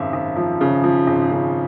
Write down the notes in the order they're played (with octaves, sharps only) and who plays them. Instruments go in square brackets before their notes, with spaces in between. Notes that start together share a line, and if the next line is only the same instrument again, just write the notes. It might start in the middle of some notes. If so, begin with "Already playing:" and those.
Already playing: [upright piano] G#1 F#2 E5
G#1
F3
C#3
F3
G#1
C#3